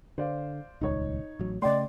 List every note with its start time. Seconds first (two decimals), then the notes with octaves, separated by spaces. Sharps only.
0.18 D3 C5 D5 F5
0.81 D#1 C#2 D#4 C#5
1.39 A1 F#3
1.62 C#3 A3 D5 D#5 G5 C6